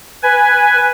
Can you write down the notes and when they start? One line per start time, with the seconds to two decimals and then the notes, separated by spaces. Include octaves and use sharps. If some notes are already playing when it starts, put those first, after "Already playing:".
0.23 B4 G#5